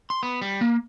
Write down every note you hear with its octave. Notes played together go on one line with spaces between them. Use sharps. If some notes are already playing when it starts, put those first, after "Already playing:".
C6
B3
G3
A#3